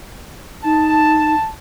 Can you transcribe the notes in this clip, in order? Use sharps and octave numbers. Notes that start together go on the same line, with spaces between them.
D#4 A5